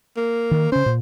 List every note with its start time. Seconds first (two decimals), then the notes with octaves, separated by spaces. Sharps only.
0.17 A#3
0.51 D#3
0.72 C#3 C#4 C5
0.86 A#2